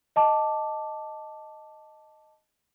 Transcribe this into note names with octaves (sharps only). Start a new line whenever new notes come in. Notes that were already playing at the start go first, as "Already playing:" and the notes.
D#5 A5 D6